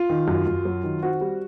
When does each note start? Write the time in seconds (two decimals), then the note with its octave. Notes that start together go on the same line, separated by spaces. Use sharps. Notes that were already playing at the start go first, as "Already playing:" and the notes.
Already playing: F4
0.10 D#3
0.28 F#2
0.47 F#2
0.65 F#3
0.84 D#3
1.03 C4 F#4
1.21 G3